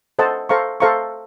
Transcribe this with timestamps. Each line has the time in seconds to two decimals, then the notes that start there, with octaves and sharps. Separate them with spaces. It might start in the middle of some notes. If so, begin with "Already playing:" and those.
0.19 A4 C5 D#5 F#5 A5
0.49 A4 C5 F5 A#5 C#6
0.80 A4 C5 F5 A#5 C#6